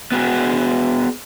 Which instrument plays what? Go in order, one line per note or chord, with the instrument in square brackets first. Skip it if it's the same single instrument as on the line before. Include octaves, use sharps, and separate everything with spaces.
[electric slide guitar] B3 F#4 G#4